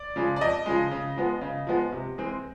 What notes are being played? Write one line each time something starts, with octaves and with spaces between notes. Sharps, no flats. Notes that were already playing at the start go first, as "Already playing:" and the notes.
Already playing: D5
C#3 F3 G#3
D5
F2 D#5
C#3 F3 G#3
C#3
F3 G#3 B3
C#3
F3 G#3 B3
C3
E3 G#3 C4